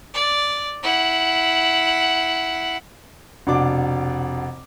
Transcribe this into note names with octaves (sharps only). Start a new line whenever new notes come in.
D5
E4 F#5
F1 B2 D4 D6